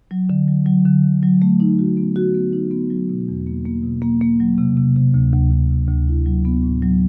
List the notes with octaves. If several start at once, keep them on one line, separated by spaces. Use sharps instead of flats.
F#3
D3
F#3
F#3
D3
D3
F#3
A3
D#4
F#4
B3
F#4
B3
D#4
B3
F#3
B2
E2
A#3
A#3
B2
A#3
A#3
F#3
C3
C3
C3
D2
D2
D2
C3
D2
E4
F#3
B3
A2
F#3